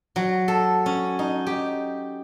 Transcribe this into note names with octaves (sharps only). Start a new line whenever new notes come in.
F#3
A4
C#4
D#4
G4